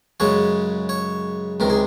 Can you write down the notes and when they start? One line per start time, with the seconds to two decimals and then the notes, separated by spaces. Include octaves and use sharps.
0.20 F#2 C#3 G#3 C#5
0.89 C#5
1.60 C#2 C3 D#3 A#4
1.70 G#4